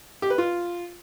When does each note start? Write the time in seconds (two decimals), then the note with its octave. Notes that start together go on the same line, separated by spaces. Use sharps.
0.22 G4
0.30 B4
0.38 F4